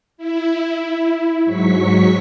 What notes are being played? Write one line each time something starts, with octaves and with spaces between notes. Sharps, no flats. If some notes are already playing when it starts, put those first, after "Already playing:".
E4
G#2 F#3 C#6 B6